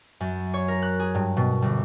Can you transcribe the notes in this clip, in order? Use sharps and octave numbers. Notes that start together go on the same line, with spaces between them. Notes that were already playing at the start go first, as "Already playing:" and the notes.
F#2
C#5
A#4
F#6
G#4
G2
B2
G1